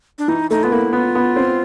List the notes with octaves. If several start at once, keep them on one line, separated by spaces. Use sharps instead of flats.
D4
E3 D#4
A3 D#4
B3 F4
A#3 E4
B3 F4
B3
C4